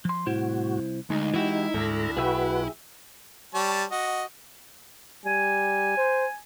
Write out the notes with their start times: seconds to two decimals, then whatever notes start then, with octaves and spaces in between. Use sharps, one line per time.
0.05 F3 C6
0.26 C2 A2 E4 F#4 C5
1.10 D2 G#3 D#4
1.34 E3 E4 F#4 G4
1.74 D2 G#2 A4 A#5
2.17 B1 F#4 G#4 B4 E5 G5
3.54 G3 C#5 A5
3.91 F#4 D#5
5.25 G3 G#5
5.97 C5